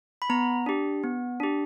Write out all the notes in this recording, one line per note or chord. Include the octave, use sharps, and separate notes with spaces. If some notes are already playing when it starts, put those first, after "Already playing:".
B5
B3 A#5
D4 G4
B3
D4 G4